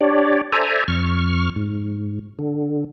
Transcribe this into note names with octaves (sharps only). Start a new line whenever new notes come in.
D4 G4 C#5 D5
A4 C5 D5 E5 G#5 A#5
F2 C#6 F6
G#2
D3